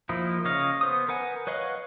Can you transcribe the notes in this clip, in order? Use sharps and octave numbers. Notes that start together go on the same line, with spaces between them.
F3 A#3 D#4 E4
C#3 C#5 D#5 F5
B3 C5 D#6
A#4 B4 F#5 G#5
B4 C#5 D#5 F5 F#5